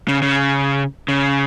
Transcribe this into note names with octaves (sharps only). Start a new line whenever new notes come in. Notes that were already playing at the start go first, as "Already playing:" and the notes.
C#3
C#3
C#3